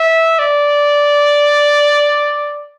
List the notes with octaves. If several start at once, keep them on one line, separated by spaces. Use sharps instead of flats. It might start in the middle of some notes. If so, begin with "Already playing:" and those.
Already playing: E5
D5